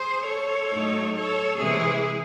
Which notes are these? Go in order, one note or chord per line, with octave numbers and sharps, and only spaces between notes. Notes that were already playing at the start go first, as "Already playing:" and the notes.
Already playing: G#4 C5
A4 C#5
A2 F#3 A3 D#4
A4 C#5
C3 E3 G#3 E4 G#4